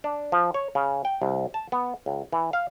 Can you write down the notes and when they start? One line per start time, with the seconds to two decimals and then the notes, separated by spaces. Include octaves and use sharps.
0.04 D4
0.32 F3
0.54 C#5
0.75 C#3
1.05 G5
1.22 C2
1.54 A5
1.72 B3
2.06 C#2
2.32 E3
2.53 F5